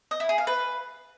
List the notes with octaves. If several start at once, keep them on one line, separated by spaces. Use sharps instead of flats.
D#5
E4
G#4
F5
B4